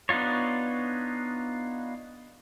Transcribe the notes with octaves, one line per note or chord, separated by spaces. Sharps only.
B3 D4 D#4 F4 C#5